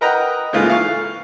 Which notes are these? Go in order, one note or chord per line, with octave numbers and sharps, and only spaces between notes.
A#4 B4 D#5 F#5 G5 A#5
G#2 C#3 E3 A3 A#3 F4
F5 C#6